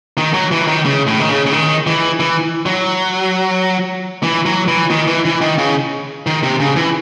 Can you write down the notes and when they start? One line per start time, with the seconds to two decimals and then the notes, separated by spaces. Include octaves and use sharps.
0.18 D#3
0.34 F#3
0.52 E3
0.67 D#3
0.85 C#3
1.07 A2
1.19 D#3
1.30 C#3
1.46 C#3
1.52 D#3
1.87 E3
2.20 E3
2.66 F#3
4.23 E3
4.46 F#3
4.68 E3
4.90 D#3
5.07 E3
5.25 E3
5.41 D#3
5.58 C#3
6.27 D#3
6.43 C3
6.60 C#3
6.76 E3